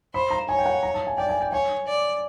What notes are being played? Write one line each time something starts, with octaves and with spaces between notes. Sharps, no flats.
C5 B5
A#5
C#5 G#5
G5
F#5
A#5
A5
G#5
D5 G5
G#5
G5
C#5 G#5
D5